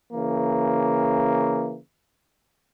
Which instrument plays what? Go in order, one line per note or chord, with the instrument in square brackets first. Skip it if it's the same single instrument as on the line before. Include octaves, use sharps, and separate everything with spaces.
[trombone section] C#3 E3 A#3